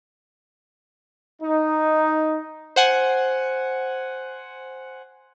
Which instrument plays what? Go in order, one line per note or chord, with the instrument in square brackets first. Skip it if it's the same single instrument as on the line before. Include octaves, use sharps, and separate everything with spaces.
[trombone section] D#4
[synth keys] C5 F#5 G#5